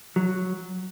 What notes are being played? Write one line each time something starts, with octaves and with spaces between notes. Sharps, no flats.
F#3